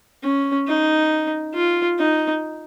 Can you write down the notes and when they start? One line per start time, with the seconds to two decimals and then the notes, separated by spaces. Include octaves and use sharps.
0.23 C#4
0.68 D#4
1.54 F4
1.99 D#4